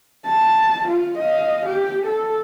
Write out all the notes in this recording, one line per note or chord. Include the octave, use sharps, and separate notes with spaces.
A5
F4
D#5 F5
G4
A4